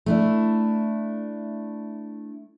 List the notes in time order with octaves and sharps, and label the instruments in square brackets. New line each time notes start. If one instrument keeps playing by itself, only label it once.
[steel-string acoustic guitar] A3 D4 E4